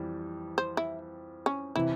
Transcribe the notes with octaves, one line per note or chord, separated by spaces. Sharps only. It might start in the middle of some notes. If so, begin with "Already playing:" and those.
Already playing: F2 E3 G3
C5
E4
C#4
C3 E3 E4